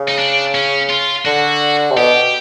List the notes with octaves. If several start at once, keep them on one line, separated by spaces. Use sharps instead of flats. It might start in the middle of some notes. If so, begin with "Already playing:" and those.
Already playing: C#3
D#4
D4
C#4
F4
D3 F#4
C3
B2 G4